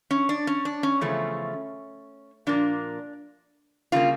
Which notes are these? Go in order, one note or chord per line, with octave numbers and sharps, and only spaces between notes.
C#4
D4
C#4
D4
C#4
E2 C#3 F3 A3
A#2 F3 A#3 D4
C#3 G3 A#3 F4